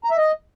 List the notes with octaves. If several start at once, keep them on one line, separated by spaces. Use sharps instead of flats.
A#5
E5
D#5